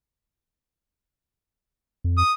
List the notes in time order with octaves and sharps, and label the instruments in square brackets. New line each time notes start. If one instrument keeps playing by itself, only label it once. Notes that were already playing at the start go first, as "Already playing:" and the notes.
[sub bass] F2
[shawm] D#6